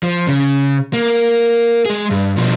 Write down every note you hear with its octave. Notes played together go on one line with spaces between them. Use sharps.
F3
C#3
A#3
G#3 G#4
G2
B2 F3